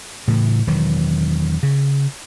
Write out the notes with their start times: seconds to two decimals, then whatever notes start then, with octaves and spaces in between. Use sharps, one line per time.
0.28 A2 C#3 E3
0.67 E1 D#3 E3 F#3
1.63 C#3